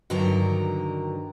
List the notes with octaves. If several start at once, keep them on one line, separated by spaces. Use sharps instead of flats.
G2 D3 D#3 F#3 A#4 A#5